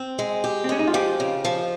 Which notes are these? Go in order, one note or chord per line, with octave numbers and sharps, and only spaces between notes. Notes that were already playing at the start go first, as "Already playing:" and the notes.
Already playing: C4
G#3
G4
C4
G#3 C#4
D#4
F4
F3 G4
C#3
F3